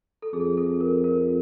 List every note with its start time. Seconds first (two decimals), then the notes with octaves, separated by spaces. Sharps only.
0.22 A4
0.33 F2 G#4
0.57 A4
0.81 A#4
1.04 A#4